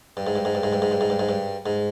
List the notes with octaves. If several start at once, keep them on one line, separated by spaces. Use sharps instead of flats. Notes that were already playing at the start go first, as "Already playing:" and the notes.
G2
G#2
G2
G#2
G2
G#2
G2
G#2
G2
G#2
G2
G#2
G2
G#2